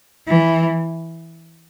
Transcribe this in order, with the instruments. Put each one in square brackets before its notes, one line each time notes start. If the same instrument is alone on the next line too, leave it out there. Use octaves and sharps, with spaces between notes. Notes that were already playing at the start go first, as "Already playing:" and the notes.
[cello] E3